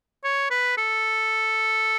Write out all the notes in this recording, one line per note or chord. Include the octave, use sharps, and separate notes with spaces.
C#5
B4
A4